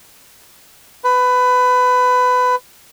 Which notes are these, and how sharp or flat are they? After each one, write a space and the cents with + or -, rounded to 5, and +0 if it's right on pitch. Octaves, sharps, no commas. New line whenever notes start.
B4 +20